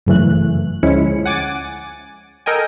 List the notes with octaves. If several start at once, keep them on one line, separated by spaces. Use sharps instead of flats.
G1 F#2 C#3 E3 A3 F#6
D2 F3 G#3 C#4 E4 C#7
F#5 G#5 D6 A6
A4 A#4 D#5 G5 G#5